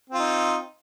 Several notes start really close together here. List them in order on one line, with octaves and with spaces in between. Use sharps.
C4 F4 D#4